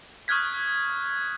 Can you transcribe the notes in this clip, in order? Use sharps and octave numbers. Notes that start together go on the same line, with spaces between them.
C#6 D#6 F6 F#6 G#6 B6